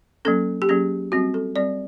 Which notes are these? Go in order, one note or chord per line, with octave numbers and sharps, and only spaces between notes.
F#3 A#3 C#4 A4
G4
F#3 A#3 C#4 G#4
G3 C4 F#4
A4
G3 C4 D5